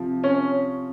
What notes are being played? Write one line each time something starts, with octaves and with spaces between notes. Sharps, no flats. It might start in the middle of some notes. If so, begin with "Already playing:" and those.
Already playing: C3 F3
C#4